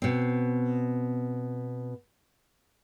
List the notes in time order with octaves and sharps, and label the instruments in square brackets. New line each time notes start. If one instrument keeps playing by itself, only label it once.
[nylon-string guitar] B2 C4